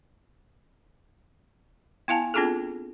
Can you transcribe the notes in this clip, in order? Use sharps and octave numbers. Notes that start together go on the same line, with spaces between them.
B3 E4 F5 G#5 A5
B3 C4 D4 F4 G#4 A4